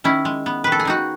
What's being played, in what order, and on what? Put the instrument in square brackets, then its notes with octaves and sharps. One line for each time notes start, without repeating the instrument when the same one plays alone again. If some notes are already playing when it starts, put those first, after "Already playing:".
[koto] D#3 C#4 E4
G#3
B3
D#3 B4
A4
G#4
D#3 D#4 F#4